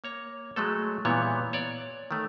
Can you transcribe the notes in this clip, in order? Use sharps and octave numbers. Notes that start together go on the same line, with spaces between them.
A#3 C#5 A#5
F#3 G#3 A3 A4
A#2 E3 G3 B3 E4 C#5
C#5 D5
D#3 A3